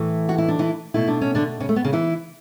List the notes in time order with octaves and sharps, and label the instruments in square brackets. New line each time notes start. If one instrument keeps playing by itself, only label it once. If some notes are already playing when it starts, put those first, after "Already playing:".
Already playing: [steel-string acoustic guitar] A2 E3 A3
F#4
E4
D4
E3 E4
B2 A3 E4
D4
C#4
D3 D4
C#3 C#4
A3
B3
C#3 C#4
E3 E4